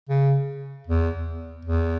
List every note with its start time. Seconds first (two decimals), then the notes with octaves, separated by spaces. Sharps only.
0.09 C#3
0.87 E2
1.65 E2